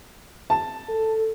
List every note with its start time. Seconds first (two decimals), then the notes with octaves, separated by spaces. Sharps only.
0.50 A5
0.89 A4